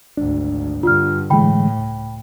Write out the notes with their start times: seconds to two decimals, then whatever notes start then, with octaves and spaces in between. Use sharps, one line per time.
0.17 G#1 D2 D4
0.83 G2 D3 F4 F6
1.30 A2 D3 E3 G#3 G5 B5
1.79 C#2